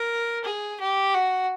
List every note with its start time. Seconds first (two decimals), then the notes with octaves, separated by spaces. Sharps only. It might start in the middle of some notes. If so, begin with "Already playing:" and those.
Already playing: A#4
0.44 G#4
0.80 G4
1.14 F#4